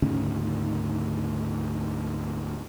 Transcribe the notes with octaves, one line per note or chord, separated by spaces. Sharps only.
D2 G#2 C#3 C#4